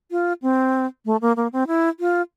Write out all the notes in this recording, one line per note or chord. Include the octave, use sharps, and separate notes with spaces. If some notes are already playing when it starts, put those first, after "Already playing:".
F4
C4
A3
A#3
A#3
C4
E4
F4